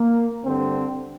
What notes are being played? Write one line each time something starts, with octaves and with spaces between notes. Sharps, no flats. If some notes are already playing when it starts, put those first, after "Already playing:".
Already playing: A#3
G2 D3 C4